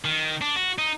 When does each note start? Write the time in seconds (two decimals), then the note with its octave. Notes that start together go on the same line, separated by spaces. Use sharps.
0.05 D#3
0.41 D4
0.56 F#4
0.78 D#4